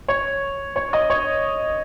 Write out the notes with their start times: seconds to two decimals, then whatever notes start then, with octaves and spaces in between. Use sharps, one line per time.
0.08 C#5
0.76 C#5
0.93 D#5
1.10 C#5